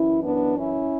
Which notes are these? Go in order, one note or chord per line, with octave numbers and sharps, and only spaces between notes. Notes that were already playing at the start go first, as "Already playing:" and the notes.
Already playing: F#2 E3 C#4 E4
B3 D4
C#4 E4